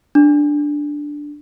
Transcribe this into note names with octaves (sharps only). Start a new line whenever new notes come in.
D4